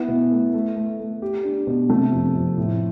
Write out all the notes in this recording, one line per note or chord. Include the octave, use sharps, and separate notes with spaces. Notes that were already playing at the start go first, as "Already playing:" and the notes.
Already playing: B3 E4
B2
A3
A3
A3
A3
G4
D4
B2
C3 A3
F2
F2
A2